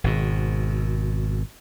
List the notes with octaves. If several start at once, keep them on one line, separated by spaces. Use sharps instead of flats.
G#1 B2